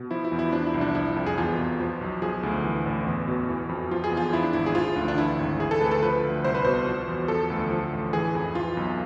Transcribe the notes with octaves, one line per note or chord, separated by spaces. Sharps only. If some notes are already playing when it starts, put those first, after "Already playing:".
Already playing: B2
F3 E4
E4
E2
E4
F3 D4
E4
C2
D4
F3 E4
F2
G#4
E2 F4
B2
F3
B1
F3 G#4
D2
E3
A1
E2
B2
E3
F2
F3 F4
G#4
E2
F4
F3 E4
D4
G#1 E4
G#4
F3 F4
D2 D4
D4
E3 E4
G#1
E3 G#4
A4
D2 B4
A4
F3 B4
D2
C2 C5
B4
B2 C5
F3
E2
F3 A4
D2
F3
A1
E3 G#4
F2
E3 F4
B1